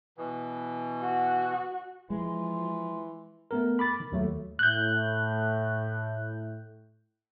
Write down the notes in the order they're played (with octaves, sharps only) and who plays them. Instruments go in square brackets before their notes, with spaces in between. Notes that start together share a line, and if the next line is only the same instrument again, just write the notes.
[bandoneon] B2 E3
[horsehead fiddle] F#4
[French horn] E3 [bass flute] F3 [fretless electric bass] G#3 [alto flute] C6
[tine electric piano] A3 B3 A#4
B5 D6 A6
D#3
D#2 F#3 A3
[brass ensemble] A2 [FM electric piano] F#6 G6